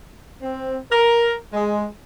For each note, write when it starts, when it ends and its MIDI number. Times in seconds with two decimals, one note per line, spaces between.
0.42 0.76 60
0.91 1.34 70
1.53 1.85 56